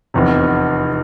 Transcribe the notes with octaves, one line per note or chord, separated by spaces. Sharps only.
F1 E2 C3